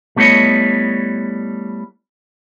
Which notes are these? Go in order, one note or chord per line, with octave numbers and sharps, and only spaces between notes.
G3 A3 B3 E4 C#5 D#5